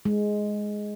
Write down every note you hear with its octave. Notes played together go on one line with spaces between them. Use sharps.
G#3